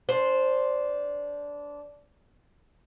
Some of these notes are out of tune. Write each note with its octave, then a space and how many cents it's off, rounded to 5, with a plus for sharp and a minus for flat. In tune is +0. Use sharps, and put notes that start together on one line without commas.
D4 -15 C5 +0